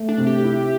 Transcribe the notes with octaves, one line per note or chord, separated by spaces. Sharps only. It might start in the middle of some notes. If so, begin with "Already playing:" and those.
Already playing: A3
D4
C3
G4
E4